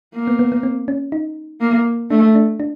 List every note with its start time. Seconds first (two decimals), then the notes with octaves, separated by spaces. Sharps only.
0.15 A#3
0.27 B3
0.39 B3
0.52 B3
0.63 C4
0.88 C#4
1.12 D#4
1.61 A#3
2.11 A3 D4
2.35 D4
2.60 D4